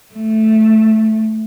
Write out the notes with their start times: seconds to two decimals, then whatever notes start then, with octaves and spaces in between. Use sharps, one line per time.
0.14 A3